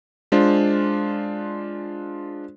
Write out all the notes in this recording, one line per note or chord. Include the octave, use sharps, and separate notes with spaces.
G#3 D4 F4 C5